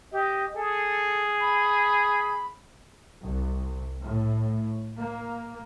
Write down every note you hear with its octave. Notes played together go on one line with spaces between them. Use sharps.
G4 D#5
G#4 A4
B5
C2
A2
A#3